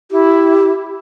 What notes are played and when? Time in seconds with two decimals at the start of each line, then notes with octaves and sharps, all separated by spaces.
0.11 E4 G4